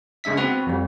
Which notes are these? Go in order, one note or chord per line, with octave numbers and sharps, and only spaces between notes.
C#3 G#3 D4 E5 B6
B3 C4 F#4 B4
F2 G3